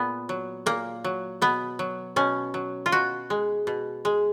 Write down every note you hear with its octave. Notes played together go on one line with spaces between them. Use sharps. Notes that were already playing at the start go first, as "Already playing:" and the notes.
Already playing: A#2 B3
F#3
A#2 A#3
F#3
B2 B3
F#3
B2 C#4
F#3
F4
B2 F#4
G#3
B2
G#3